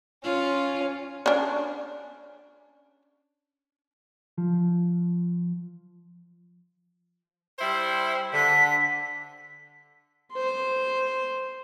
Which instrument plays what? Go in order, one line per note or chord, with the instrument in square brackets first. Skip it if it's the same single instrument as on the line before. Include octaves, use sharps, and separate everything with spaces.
[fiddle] C#4 [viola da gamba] F4
[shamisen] C#4 D4
[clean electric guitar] F3
[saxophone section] G3 E4 C5
[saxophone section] D3 [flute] B6
[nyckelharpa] C5 C6